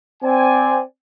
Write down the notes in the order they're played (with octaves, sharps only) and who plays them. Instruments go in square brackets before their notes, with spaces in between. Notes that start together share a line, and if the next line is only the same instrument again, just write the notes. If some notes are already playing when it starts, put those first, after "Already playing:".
[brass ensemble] C4 D5 G#5